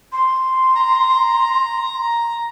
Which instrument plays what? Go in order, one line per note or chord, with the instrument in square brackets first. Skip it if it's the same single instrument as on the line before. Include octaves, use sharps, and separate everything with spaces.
[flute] C6
[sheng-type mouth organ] A#5